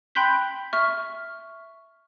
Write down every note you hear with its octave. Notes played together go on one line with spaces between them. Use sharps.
G5 B5 C6 F#6 G6 B6
E5 C#6 F6